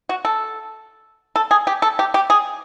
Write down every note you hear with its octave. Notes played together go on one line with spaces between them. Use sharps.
F#4
A4
A4
G#4
G4
A4
G4
G4
G#4